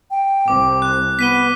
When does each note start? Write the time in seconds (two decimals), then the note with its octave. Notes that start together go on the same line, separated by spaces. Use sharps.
0.11 G5
0.48 C2 C4 D6
0.82 F#6
1.19 B3 B6 D#7 G7